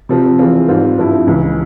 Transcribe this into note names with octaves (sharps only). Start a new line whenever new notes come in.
C3 F3 C4
E3 G#3 C4 F4
G#2 G3 C4 F4
G2 F3 C4 E4
C#2 C#3 E3